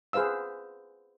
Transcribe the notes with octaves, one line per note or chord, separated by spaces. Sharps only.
G#4 B4 C5 F5 E6